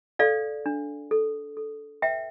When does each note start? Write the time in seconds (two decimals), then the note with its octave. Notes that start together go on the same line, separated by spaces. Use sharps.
0.19 A4 D5 F5
0.66 D4
1.11 A4
1.57 A4
2.02 B4 E5 G5